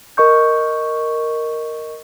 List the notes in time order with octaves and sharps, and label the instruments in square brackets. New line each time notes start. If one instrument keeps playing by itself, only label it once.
[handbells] A#4 D#5 C#6 G6